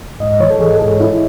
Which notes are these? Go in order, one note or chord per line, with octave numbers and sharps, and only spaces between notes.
G#2 D#5
E3 C#5
A4
E3 G#4
A4
G#2 G#4
G#2 E4